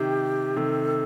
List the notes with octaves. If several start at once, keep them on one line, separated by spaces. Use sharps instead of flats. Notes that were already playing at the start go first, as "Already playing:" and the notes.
Already playing: C3 D#3 G4
C3 D#3 A4